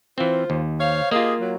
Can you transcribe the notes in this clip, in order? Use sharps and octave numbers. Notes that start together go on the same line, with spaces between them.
E3 C4 F4 C5
D#2
C5 C#5 F5
A#3 F4 G4 G#4 D#5
F#3